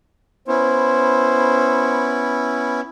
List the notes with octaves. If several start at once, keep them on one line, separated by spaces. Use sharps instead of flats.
B3 C#4 E4 C5